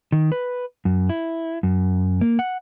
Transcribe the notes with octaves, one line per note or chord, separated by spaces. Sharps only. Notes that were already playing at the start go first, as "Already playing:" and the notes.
D#3
B4
F#2
E4
F#2
A#3
F#5